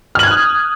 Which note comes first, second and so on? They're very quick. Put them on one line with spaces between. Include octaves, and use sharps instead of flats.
F6 F#7 G#6 F#6 D#6